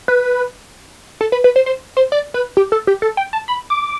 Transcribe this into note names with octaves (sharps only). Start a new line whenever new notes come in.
B4
A4
B4
B4
C5
C5
C5
D5
B4
G4
A4
G4
A4
G5
A5
B5
D6